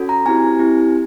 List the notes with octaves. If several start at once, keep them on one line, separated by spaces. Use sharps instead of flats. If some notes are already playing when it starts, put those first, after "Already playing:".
Already playing: C#4 F#4 A4
A#5
C4 E4 G4 G#5
C4 E4 G4